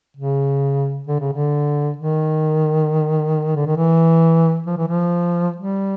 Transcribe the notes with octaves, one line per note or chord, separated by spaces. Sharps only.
C#3
D3
C#3
D3
D#3
D3
D#3
E3
F3
E3
F3
G3